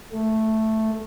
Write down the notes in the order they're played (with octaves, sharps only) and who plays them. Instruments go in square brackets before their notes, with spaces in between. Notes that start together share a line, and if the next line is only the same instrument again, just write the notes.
[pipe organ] A3